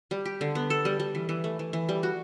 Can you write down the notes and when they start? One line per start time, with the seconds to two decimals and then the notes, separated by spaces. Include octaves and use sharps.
0.11 G3
0.26 G4
0.41 D3
0.55 B3
0.70 A4
0.85 G3
1.00 G3
1.15 E3
1.29 E3
1.44 A3
1.59 E3
1.73 E3
1.89 G3
2.03 F#4